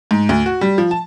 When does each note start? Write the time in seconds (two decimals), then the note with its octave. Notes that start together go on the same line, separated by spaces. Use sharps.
0.11 G#2
0.29 D2
0.46 F#4
0.61 G3
0.78 F3
0.91 A5